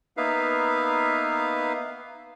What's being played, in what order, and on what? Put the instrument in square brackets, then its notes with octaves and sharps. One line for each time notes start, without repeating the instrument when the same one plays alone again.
[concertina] A#3 B3 D#4 B4 E5 F5